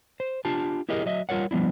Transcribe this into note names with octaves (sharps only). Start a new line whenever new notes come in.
C5
D4 F4 G4 A5
E4 G4 G#4 A#4 D#5
F#3 D#5 E5
G3 F4 A#4 C#5 F#5
F3 G3 B3 D4 E4